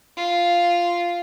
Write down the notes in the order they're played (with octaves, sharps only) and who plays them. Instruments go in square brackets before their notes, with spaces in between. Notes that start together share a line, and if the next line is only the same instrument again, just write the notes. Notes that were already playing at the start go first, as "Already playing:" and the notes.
[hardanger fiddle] F4